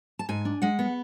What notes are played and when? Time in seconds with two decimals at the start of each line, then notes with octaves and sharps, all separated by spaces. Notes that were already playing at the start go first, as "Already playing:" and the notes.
0.19 A5
0.29 G#2 G#5
0.45 D4
0.62 G#3 F#5
0.79 B3